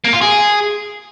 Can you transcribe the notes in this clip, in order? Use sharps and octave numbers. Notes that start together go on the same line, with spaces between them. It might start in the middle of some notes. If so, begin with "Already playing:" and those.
A#3
F4
G#4